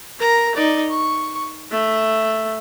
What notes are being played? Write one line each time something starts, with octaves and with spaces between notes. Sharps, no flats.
A#4 A#5
D#4 D5
C#6
A3 E5